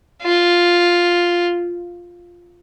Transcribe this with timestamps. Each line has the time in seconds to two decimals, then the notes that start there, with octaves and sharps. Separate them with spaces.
0.22 F4